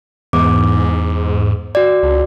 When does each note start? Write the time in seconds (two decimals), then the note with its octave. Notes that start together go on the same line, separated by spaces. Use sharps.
0.33 E2 G#2 D6
1.75 F#4 D5
2.03 C#2